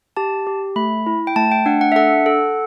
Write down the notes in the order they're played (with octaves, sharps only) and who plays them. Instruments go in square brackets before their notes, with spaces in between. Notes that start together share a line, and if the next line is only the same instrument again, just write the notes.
[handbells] G4 A5
G4
A3 B5
E4
G5
A3 A5
G5
D4 F#5
F#5
E5
A4 F#5
A4